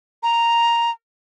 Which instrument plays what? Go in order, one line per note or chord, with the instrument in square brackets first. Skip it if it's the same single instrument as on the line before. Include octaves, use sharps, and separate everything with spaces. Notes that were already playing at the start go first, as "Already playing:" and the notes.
[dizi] A#5